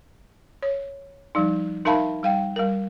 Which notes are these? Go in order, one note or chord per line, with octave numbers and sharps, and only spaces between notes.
C#5
F3 G3 D#4
D#4 A#4 E5 F5 A5 B5
G3 F5 G5
G3 A#4